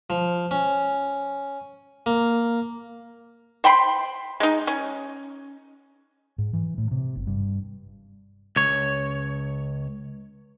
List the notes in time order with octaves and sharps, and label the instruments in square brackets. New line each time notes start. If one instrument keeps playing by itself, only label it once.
[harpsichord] F3
C#4
A#3
[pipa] C5 G5 B5 C6
G#3 D#4
C#4
[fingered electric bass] G#2
E3
A2
C3
G1
G2
[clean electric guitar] C#2 C#5